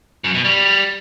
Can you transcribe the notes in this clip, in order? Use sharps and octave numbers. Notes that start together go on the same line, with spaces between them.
F#2
B2
G3